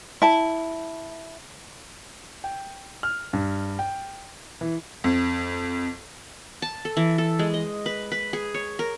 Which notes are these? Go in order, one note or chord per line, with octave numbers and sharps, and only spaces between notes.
E4 A5
G5
F6
G2
G5
E3
F2
A5
A4
E3
A4
G#3
D#5
B4
B4
G#4
C#5
A#4